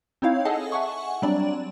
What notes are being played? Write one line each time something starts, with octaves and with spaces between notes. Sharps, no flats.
C4 D#4 E4 C#5 F5
G#4 A4 D#5 F#5 G#5 A5
E5 F#5 G#5 C#6
F#3 G3 C4 D4 D5